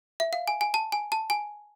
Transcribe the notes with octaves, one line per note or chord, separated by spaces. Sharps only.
E5
F5
G#5
G#5
A5
G#5
A5
G#5